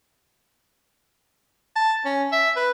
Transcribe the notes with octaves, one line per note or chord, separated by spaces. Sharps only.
A5
C#4
E5
B4